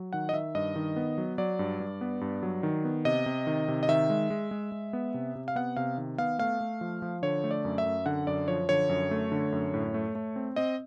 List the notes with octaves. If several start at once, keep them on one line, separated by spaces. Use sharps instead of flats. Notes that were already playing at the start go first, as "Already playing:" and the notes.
Already playing: F#3
D#3 F#5
D#5
D#3 E5
G2 D#5
D#3
B3
F#3
F#3 D5
G2
G2
B3
G2
F#3
D#3
B3
C3 D#5
C3
D#3
C3
D#5
D#3 E5
G#3
G#3
G#3
G#3
B3
C3
C3
F5
B3 F#5
C3 F5
D#3
B3 F5
A3 F5
A3
F3
F3
D3 C#5
A3
D5
F#2
E5
F#2
D3 F#5
F#2 D5
F3 C#5
D3 C#5
F#2
A3
D3
F#2
A2
A3
A3
C4
C4 D#5